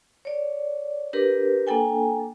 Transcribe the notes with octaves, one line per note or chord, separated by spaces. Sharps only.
C#5 D5
D4 G4 A#4 B4
A#3 D4 A4 G5 G#5